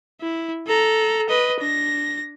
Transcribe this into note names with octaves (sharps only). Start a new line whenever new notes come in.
E4
A4 A#5
B4 D#5
D4 A#6